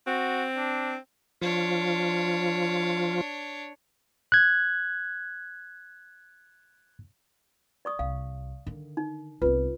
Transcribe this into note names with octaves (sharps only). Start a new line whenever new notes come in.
C4 F#4
D4
F3 D4 F4 C#5
F#6 G#6
D5 C#6 D#6
C2 F5
D3 D#3
D#4
C2 B3 F4 B4